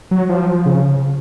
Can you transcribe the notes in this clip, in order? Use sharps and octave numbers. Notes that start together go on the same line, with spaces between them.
F#3
F3
C#3